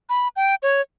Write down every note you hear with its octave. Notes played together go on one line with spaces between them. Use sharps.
B5
G5
C#5